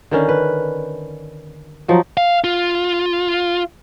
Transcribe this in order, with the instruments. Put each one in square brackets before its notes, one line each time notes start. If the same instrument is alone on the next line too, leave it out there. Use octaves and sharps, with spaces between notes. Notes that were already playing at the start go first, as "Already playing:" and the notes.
[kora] D3 D#3 C#4
B4
F3 F#3 D#4
[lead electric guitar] F5
F4